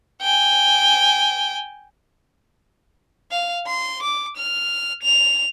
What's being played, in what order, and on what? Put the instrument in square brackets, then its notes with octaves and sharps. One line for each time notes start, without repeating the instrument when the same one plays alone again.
[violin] G5 G#5
F5
C6
D6
F6
F7